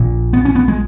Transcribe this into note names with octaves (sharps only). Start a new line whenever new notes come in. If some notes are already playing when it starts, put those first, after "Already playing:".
Already playing: A#1 A#2
B3
C#4
B3
G#3